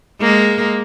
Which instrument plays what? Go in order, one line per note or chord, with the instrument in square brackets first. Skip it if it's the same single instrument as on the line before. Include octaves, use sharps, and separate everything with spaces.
[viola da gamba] G#3 A#3